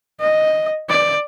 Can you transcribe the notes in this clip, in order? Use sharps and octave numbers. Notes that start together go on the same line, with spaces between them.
D#5
D5